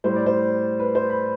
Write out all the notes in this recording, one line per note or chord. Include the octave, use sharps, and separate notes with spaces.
A2 G3 C5
D5
C5
B4
C5
B5